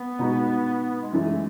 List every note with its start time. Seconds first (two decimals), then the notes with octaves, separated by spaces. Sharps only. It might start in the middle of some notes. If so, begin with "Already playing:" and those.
Already playing: B3
0.19 B2 G#3 D#4 F#4
1.02 G#3
1.12 F#2 E3 G#3 A3